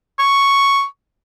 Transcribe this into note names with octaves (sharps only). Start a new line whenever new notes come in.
C#6